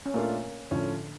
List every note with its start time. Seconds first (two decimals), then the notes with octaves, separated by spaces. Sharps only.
0.06 C#4
0.14 A#2 A3 A#3 D4 F4
0.71 A2 D3 F3 C#4